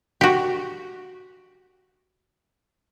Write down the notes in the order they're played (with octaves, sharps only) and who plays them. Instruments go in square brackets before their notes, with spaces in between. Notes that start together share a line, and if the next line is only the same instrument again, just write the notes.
[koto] F#4 G4